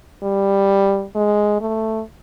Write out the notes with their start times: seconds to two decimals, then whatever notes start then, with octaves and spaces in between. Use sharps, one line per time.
0.23 G3
1.15 G#3
1.61 A3